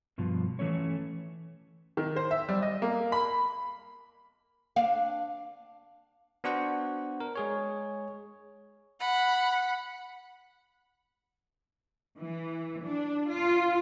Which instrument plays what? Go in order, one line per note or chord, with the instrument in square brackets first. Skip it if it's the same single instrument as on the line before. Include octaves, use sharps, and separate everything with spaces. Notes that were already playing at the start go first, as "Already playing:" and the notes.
[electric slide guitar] G2 B2 F3
E3 A3 C#4 C#5
[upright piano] D#3
C5
E5
G3
D#5
A#3
B5
[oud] D4 F5
[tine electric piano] B3 D4 F#4 C5 F#5
A#4
G#3 G#4 C#5
[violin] F#5 [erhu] B5
[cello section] E3
D4
F4